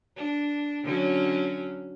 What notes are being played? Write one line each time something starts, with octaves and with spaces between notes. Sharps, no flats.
D4
D3 F#3 C#4